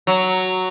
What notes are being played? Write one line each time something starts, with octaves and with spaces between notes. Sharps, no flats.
F#3